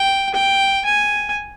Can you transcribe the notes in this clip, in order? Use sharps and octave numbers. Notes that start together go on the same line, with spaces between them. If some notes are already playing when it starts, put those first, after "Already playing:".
Already playing: G5
G5
G#5